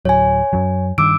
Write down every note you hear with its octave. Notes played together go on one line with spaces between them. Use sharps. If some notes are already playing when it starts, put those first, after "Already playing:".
D1 F#3 C#5 G#5
F#2 F#3
G2 D#3 D6 E6 D7